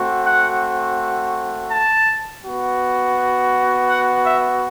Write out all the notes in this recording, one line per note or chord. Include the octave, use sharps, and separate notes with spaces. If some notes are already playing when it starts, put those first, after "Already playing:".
Already playing: A3 C4 F#4
F#5
A5
B3 F#4
F#5
E5